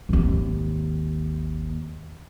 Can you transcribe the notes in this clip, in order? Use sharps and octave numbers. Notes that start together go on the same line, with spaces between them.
G#1 D#2